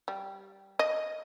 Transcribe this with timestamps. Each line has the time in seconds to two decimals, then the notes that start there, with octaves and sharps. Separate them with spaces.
0.08 G3
0.79 D#5